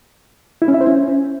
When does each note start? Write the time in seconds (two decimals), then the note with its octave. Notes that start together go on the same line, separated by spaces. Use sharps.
0.62 E4
0.68 C#4
0.74 E5
0.81 C5
0.87 C#4